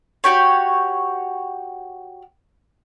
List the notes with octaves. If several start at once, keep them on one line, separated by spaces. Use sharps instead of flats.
F#4 G4 C#5